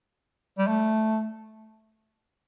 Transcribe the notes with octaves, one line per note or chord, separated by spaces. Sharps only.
G3
A3